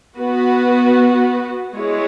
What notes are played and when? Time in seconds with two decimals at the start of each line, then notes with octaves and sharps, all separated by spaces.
0.17 B3 F#4 B4
1.76 G#3 E4 G#4 C#5